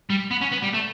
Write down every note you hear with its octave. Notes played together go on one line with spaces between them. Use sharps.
G3
B3
C#4
B3
G3
A3